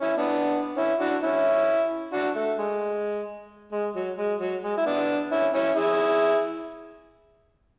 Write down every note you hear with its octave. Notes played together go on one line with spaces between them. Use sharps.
C#4 E4
B3 D4
C#4 E4
D4 F#4
C#4 E4
D4 F#4
A3
G#3
G#3
F#3
G#3
F#3
G#3
E4
B3 D4
C#4 E4
C#4 E4
E4 G#4